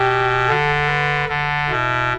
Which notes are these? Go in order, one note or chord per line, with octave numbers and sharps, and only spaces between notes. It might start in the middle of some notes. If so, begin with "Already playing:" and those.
Already playing: B2 G4
D3 A4
B4
D3 A4
B2 E4